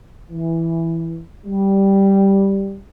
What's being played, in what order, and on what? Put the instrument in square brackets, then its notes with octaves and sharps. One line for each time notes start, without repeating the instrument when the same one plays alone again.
[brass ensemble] E3
G3